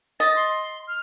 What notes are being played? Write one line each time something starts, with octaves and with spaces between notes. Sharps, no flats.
D#5 A6
C6
F6